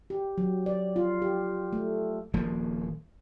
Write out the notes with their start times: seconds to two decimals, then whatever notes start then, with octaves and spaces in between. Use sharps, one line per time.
0.10 G4
0.38 F#3
0.66 D5
0.96 F4
1.22 G4
1.73 A3
2.34 D#1 F3 A#3